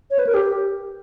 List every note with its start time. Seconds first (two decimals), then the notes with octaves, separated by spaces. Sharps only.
0.11 C#5
0.19 B4
0.27 A#4
0.34 G4